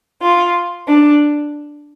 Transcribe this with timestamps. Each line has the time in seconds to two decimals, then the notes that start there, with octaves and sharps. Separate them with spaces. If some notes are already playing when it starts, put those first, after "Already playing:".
0.22 F4
0.88 D4